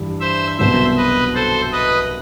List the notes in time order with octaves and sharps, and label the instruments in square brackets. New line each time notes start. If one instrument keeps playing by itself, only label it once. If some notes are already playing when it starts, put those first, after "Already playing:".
Already playing: [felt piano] G2 E3 G3
[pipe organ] C5 E5
[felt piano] C2 B2 F#3 [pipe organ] C5 E5
[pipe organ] B4 D#5
A4 C5
B4 D#5